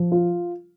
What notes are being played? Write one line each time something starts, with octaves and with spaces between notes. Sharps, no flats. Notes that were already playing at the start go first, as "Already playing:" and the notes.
Already playing: F3
F4